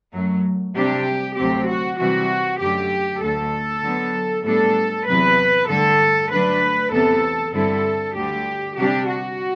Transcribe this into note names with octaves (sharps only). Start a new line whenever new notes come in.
F#2 F#3 A3
C3 G3 D4 G4
D2 C3 F#3 C4 G4
F#4
C3 E3 G3 F#4
F#2 D3 F#3 A3 G4
D2 D3 A3 A4
D3 F#3 B3
A2 G3 B3 D4 A4
E2 C3 F#3 B4
G2 D3 A3 A4
D3 F#3 A3 D4 B4
E2 C3 E3 B3 A4
G2 D3 G3 C4 E4 A4
D2 D3 G3 G4
C3 G3 D4 G4
F#4